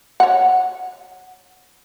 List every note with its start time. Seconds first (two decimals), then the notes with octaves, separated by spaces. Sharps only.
0.20 C#5 F#5